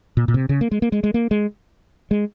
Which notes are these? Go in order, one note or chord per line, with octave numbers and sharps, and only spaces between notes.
A#2
A#2
C3
C#3
A#3
G#3
A#3
G#3
G#3
A#3
G#3
G#3